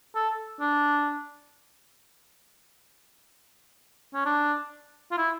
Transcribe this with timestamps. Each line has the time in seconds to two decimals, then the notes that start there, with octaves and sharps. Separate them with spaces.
0.15 A4
0.61 D4
4.15 C#4
4.25 D4
5.11 F4
5.18 E4